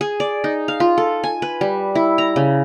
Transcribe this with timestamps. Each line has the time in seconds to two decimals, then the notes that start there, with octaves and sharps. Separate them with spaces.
0.01 G#4
0.20 D5
0.44 D#4
0.68 F5
0.80 F4
0.98 A4
1.24 G#5
1.42 B4
1.61 G3
1.95 E4
2.18 A#5
2.36 C#3